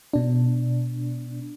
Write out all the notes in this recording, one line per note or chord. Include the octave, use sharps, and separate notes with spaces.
B2 D4